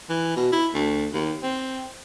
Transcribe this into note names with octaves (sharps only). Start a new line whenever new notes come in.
E3
B2
E4
D2
D#2
C4